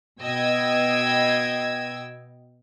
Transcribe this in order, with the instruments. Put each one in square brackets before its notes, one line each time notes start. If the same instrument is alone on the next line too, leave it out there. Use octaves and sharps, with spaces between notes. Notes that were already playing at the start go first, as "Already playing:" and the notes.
[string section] B2 D#5 G5 E6 G#6